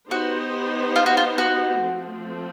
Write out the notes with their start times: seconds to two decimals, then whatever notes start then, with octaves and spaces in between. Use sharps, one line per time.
0.10 B3 D#4 F#4 G4 C5
0.96 F4
1.06 F#4
1.17 F4
1.38 F#4
1.80 F3 A3 C4